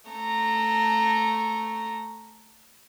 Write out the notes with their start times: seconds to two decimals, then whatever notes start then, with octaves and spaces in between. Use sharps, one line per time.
0.10 A3 A#5